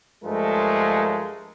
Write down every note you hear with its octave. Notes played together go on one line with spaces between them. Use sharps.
G2 F3 G#3 A3 A#4